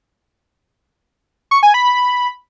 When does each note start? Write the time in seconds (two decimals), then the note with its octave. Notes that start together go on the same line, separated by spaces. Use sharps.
1.51 C#6
1.63 G#5
1.74 B5